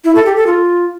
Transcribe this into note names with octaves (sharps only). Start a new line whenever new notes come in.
E4
A4
G4
A4
F4